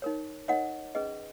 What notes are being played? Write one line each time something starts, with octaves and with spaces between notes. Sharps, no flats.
D#4 A#4 C#5
D#4 A#4 C#5 D#5 F#5
C#4 G#4 B4 D#5